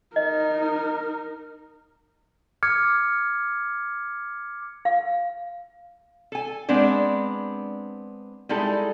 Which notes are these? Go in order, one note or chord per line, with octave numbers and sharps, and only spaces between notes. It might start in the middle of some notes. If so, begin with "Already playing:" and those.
D#4 A#4 D#5
D6 F6 G#6 C#7
F5
A4 G#5
G#3 B3 C4 D4 D5
G3 G#3 D#4 E4 A4